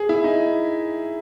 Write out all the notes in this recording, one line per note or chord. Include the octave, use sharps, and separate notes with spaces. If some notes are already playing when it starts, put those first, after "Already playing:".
Already playing: G#4
E4
D#4